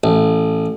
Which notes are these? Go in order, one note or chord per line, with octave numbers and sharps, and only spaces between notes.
A1